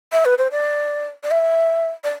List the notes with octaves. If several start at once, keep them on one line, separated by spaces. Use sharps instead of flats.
E5
B4
C5
D5
D5
E5
D5